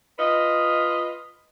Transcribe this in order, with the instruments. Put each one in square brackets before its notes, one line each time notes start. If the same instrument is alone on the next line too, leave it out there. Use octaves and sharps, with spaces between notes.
[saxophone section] F4 B4 D#5